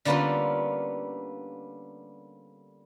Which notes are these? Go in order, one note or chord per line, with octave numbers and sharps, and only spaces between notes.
D3 G3 A#3 B3 C#4 F4